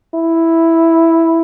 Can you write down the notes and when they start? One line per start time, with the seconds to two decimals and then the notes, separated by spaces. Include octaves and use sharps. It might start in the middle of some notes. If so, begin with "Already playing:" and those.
0.15 E4